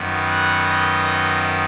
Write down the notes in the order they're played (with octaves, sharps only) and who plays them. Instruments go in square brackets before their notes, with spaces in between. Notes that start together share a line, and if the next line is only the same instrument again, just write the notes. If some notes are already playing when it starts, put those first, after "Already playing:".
Already playing: [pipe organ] F#2 D#3 B3
F#5
D#5
D#5